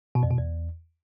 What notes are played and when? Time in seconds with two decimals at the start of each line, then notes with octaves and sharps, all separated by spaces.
0.15 B2
0.23 F2
0.31 B2
0.38 E2